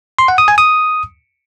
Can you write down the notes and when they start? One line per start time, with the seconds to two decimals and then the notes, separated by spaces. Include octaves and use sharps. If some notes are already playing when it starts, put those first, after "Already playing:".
0.19 C6
0.28 F#5
0.38 D#6
0.48 G#5
0.58 D#6